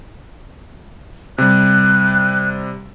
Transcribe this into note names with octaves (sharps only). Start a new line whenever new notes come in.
C3 G3 F#6